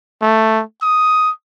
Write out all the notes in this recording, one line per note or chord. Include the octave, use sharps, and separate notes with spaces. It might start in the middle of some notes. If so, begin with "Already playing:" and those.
A3
D#6